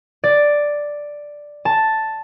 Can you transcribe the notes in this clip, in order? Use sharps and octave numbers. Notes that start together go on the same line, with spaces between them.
D5
A5